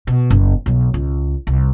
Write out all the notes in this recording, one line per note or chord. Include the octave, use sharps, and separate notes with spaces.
B2
F#1
B1 F#3
C#2
C2